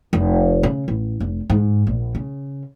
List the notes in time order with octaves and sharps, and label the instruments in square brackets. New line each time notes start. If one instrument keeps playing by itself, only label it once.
[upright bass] F1
C#3
A1
F1
G#2
A#1
C#3